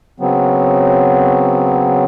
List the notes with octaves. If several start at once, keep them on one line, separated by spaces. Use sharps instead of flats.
C#3 F#3 B3 C4